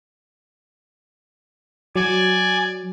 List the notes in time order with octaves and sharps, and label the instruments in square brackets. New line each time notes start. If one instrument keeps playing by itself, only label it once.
[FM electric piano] F#3 [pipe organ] D5 G#5